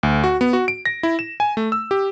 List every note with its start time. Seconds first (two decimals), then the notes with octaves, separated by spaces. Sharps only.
0.03 D2
0.24 F#4
0.41 B3
0.53 F#4
0.68 D7
0.85 A#6
1.03 E4
1.19 E7
1.40 G#5
1.57 A3
1.72 E6
1.91 G4